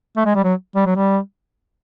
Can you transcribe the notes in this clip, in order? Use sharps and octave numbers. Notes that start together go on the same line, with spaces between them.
A3
G#3
G3
F#3
G3
F#3
G3